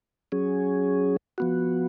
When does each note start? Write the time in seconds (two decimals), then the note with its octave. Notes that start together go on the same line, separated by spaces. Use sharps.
0.32 F#3 C#4 G#4
1.38 F3 B3 F#4